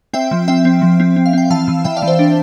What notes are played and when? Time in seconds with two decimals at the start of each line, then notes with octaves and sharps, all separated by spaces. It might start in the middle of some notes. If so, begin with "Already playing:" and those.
0.13 C4 E5 G5
0.31 F3
0.48 C4 E5 G5
0.65 C4
0.82 F3
1.00 C4
1.16 C4
1.26 F5
1.33 C4 G5
1.50 E3 F5 A5
1.68 E3
1.84 E3 E5 G5
1.97 D5 F5
2.02 E3
2.07 C5 E5
2.19 D4